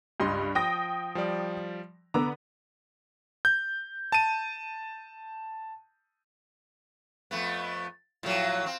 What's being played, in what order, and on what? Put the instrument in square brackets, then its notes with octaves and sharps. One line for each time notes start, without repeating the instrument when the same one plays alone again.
[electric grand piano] C#2 D#5 C6 [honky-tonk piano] G2
[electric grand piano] F3 [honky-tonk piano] G5 D#6 A#6
[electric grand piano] F3 G3 D5
[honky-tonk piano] D3 B3 [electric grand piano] A#5 D6 E6
[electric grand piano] G6
A5 D#7
[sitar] F2 A3 B3
A2 F3 F#3
C4